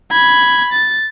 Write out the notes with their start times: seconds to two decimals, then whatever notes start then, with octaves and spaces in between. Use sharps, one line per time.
0.12 B5 G#6
0.73 A6